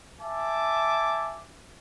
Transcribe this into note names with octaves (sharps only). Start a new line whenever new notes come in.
E5 G#5 A5 D6